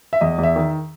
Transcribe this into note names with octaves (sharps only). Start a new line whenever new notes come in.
E5
E2 D#5
E2
E5
D#3